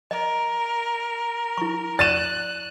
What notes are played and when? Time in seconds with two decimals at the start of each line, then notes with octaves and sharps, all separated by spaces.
0.11 A#4 D#5
1.58 E4 C#6
1.99 D5 C#6 F#6 A6 D#7 E7